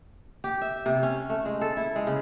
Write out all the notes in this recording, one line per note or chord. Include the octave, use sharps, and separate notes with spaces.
G4
E5
C3
C#4
A3
G#3
A4
E4
G#3
C#3